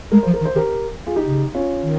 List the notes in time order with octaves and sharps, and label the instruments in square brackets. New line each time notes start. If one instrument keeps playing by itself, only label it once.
[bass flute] G#3 [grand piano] A#4
[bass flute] F3 [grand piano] C5
[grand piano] A#4
[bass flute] D#3
[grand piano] C5
[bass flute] D#3 [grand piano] G4 A#4
[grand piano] F4 G#4
D#4 G4
[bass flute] C#3
[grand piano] C#4 F4
[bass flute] D#3